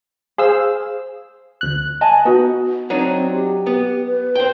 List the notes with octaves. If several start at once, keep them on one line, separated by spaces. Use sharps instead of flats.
G#4 C5 F5 E6
D2 F#6
D#5 G#5 A5
B3 D#4 F#4
F#3 C4 D4 D#4
G4
B3
B4
C5 G5